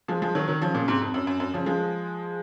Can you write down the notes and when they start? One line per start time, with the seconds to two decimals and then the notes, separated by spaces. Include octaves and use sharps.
0.08 F3 G#3
0.22 F3 G#3
0.35 D#3 F#3
0.48 D#3 F#3
0.61 C#3 F3
0.74 A#2 C#3
0.88 G#2 C3
1.01 F2
1.14 F#2
1.27 F#2
1.40 F#2
1.54 C#3 F3
1.66 F3 G#3